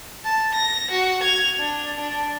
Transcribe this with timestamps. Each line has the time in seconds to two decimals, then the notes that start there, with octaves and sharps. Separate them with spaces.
0.25 A5
0.55 A#6
0.91 F#4
1.23 G#6 F7
1.59 D4
2.00 D4